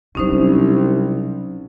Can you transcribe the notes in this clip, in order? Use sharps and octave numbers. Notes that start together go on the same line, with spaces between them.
C2 B2 F#3 C#4 D#4 C5